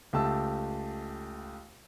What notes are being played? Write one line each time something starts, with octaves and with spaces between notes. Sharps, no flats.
C#2 A3 G4 A5 E6